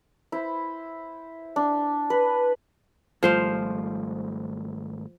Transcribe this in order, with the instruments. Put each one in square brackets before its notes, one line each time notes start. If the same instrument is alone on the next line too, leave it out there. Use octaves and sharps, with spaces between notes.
[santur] E4 C5
D4
B4
[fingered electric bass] G#1 G3 A3 [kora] F3 C5 F5